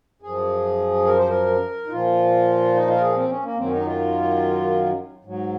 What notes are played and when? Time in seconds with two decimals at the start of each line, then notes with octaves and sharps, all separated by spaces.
0.22 F#2 F3 G#4
1.06 A#4
1.17 C5
1.29 A#4
1.86 D#4
1.90 A#2 F3 F4
2.74 D#4
2.88 F4
2.95 A#4
3.01 G#4
3.16 C4
3.29 C#4
3.43 A#3
3.57 F#2 D#3 F#3 C4
3.66 C#4
3.71 D#4
3.86 F4
5.25 G#2 F#3